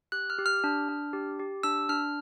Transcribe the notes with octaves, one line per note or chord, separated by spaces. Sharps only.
G4 F#6
F6
G4
F6
D4
D4
G4
G4
D4 E6
D4 F6